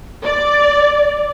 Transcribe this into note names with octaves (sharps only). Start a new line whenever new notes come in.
D5